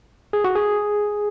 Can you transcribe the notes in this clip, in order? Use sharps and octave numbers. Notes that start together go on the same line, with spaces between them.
G#4
F#4
G#4